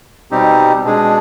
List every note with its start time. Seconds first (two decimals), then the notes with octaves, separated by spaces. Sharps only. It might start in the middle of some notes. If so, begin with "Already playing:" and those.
0.31 B2 G3 C4 D#4 G4
0.84 B2 G#3 D4 G#4